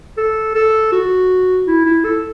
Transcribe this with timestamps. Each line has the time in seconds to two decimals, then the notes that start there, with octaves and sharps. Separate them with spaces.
0.17 A4
0.55 A4
0.92 F#4
1.67 E4
1.85 E4
2.05 A4